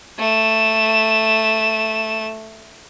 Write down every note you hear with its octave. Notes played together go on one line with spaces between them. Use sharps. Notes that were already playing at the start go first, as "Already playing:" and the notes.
A3 E7